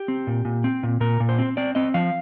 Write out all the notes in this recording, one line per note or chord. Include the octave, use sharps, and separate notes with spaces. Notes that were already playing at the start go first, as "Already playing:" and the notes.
Already playing: G4
C4
A#2
A#2
C4
A#2
A#2 A#4
A#2
C5
C4
C4 D5
C4 D#5
F3 F5